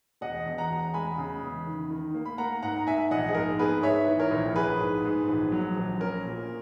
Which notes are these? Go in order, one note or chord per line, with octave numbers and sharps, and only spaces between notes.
E1 D#5 F#5
E2
F#5 A#5
E1
G#3 G#5 B5
C#3
E2
D#3
D#3
A#3
B5
A#3 F#5 A#5
G#2 F#5 A#5
A#5
G#2 E5 G#5
A#1 D#5 F#5
G#4
G#2 A#4
B3 G#4 B4
G#2 C#5 E5
E3
A#4 C#5
A#1
A#1 G#4 B4
G#2
G#2
A#1
F#3
A#1
C#4 A#4
A#2